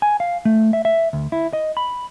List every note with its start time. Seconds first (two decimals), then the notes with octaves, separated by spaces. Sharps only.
0.02 G#5
0.20 F5
0.45 A3
0.73 E5
0.85 E5
1.13 D2
1.32 E4
1.53 D#5
1.77 B5